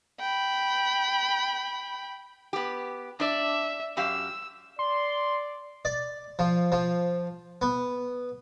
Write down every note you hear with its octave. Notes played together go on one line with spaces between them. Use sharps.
G5 B5
B3 G4
D4 D5 E5
F#2 G4 F5 E6
D5 C6
D5
F3
F3
B3